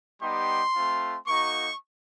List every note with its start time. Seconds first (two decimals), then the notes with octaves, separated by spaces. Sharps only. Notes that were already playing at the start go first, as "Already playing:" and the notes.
0.21 G3 B3 D#4 G4 C6
0.76 A3 C4 F4
1.28 A#3 D#4 F#4 C#6